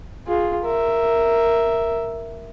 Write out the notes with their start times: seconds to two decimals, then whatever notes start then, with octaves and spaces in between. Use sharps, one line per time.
0.27 F4 G#4
0.64 A#4 E5